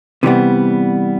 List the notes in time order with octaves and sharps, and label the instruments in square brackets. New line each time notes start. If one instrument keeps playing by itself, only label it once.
[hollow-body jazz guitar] C3 E3 G3 B3